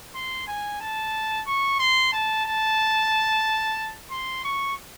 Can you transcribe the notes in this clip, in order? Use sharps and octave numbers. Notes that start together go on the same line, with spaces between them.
C6
G#5
A5
C#6
C6
A5
A5
C6
C#6